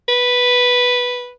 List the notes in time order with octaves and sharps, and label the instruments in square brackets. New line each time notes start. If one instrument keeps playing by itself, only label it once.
[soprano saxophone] B4